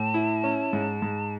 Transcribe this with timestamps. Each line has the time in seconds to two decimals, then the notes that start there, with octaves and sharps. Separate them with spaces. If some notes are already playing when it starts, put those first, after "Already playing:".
Already playing: A2 A5
0.14 E4
0.44 C#4
0.73 G#2
1.02 G#2